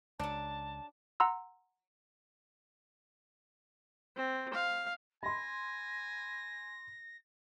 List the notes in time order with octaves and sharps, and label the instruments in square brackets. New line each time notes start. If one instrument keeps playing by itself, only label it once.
[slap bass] C#2 [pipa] F#3 D4 [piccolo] A5
[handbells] F#5 A#5 C6 E6
[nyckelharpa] C4
F5
[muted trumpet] G#5 [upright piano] B5 C6 [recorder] A#6